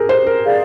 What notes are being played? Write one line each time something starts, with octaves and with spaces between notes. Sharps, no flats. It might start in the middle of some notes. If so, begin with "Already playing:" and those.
Already playing: G4 G#4 A#4
C5
A#4
G#4 D5 F5